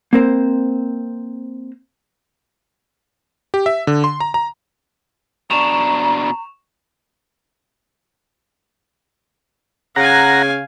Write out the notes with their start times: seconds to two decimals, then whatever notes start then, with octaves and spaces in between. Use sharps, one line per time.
0.13 A#3 C4 A#4 C5
3.54 G4
3.66 E5
3.87 D3
4.04 C6
4.20 A#5
4.34 A#5
5.50 B2 D4 A#5 C#6 E7 F7
9.96 C#3 F5 F#5 G#5 A#5